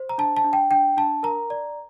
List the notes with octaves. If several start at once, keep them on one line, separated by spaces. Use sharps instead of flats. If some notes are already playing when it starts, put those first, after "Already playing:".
Already playing: C5
A#5
D4 A5
A5
D4
G5
D4 G5
D4 A5
A#4 A#5
D5